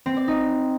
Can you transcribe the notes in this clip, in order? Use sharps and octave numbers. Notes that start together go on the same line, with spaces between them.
C4
D5
D#4